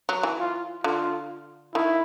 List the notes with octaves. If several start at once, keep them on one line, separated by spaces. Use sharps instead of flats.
F#3
E3
F4
D3 F4
D#3 E4